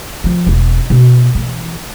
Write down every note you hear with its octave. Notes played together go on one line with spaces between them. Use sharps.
F3
E1
B2
E3